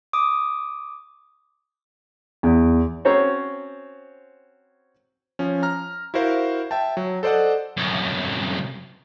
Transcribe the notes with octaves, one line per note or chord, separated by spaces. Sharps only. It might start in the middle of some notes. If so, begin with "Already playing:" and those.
D6 D#6
E2
C4 C#4 F#4 C5 C#5 A#5
F3 C#4
A#5 F6
E4 F#4 A#4 C5 F5
E5 G5 A5
F#3
A4 C5 D5 D#5 F#5
C2 F#2